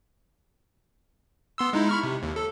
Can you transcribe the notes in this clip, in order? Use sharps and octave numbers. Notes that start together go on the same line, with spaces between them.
B3 C6 E6
G#3 D#4 E4
B5 C#6 F6
C3
D#2
A4